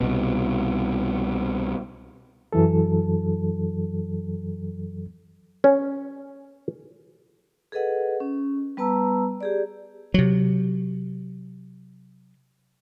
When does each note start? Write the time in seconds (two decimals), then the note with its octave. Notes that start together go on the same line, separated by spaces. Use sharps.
0.01 C2 B2
2.53 F#2 E3 F#3 A4
5.64 C#4
7.72 G#4 A4 B4 D#5 F#5
8.20 C#4
8.77 G3 B3 B4 A5 A#5 E6
9.41 G4 G#4 D5
10.14 C3 F#3